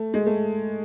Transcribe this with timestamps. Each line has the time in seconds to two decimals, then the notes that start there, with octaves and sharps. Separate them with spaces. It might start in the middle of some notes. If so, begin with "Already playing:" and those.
Already playing: A3
0.14 G#3
0.26 A3